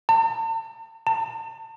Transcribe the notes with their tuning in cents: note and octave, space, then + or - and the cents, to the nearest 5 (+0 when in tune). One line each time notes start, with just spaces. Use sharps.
A5 +45
A5 +35